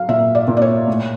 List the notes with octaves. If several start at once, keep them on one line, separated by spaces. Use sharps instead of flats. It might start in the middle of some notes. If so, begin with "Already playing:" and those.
Already playing: F#3 F5
A#2 E5
D5
A#2
D5
C#5
A2